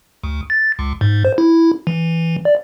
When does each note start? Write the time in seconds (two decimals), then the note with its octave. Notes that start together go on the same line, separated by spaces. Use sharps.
0.24 D2
0.50 A6
0.79 C#2
1.01 G#2
1.25 C5
1.38 E4
1.87 E3
2.45 D5